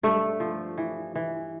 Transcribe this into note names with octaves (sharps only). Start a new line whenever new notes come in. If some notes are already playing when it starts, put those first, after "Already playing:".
G2 A3
F3
E3
E3